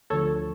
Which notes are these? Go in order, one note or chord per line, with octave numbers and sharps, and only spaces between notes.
D2 D3 F3 A4 C#5